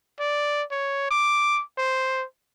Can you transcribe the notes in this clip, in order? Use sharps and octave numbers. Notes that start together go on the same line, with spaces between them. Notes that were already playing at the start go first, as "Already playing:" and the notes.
D5
C#5
D6
C5